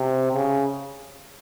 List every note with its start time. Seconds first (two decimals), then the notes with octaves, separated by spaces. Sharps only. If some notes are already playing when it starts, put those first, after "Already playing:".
Already playing: C3
0.32 C#3